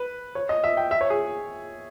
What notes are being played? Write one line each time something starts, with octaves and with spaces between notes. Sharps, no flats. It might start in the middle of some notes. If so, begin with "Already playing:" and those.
Already playing: B4
C#5
D#5
E5
G5
E5
C#5
G#4